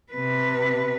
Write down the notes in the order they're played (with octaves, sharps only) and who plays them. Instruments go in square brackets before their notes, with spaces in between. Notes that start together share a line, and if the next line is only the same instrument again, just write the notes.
[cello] C3 B4